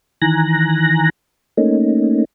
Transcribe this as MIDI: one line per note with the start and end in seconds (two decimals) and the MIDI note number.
0.22 1.10 51
0.22 1.10 52
0.22 1.10 80
0.22 1.10 82
0.22 1.10 90
0.22 1.10 94
1.57 2.25 57
1.57 2.25 58
1.57 2.25 61
1.57 2.25 63